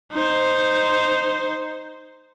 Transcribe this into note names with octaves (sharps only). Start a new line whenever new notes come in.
D#4 C5